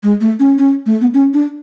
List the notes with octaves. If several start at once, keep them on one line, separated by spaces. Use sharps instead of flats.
G#3
A3
C#4
C#4
A3
B3
C#4
D4